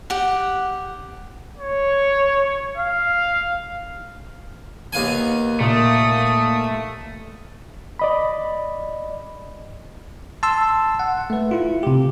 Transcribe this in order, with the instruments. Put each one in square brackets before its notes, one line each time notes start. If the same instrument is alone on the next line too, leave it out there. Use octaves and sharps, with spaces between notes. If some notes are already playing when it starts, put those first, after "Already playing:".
[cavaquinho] G4 F#5
[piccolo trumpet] C#5
F5
[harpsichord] D#2 F5 G#5 [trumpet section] B3
[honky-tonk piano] A#2 [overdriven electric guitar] A3 [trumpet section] D#6
[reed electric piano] D5 D#5 B5
[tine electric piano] A5 C6 E6
F#5
A3 B4
E4 F4
C3 G4